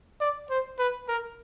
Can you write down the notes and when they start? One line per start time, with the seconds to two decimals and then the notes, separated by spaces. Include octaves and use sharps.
0.20 D5
0.50 C5
0.79 B4
1.08 A#4